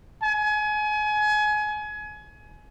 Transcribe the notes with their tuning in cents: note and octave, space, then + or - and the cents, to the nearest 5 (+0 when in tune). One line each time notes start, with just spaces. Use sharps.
G#5 +30